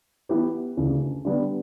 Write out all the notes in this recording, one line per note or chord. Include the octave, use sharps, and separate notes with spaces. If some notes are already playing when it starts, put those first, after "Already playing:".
E3 B3 E4 G4 B4
D2 C#3 E3
D3 G3 B3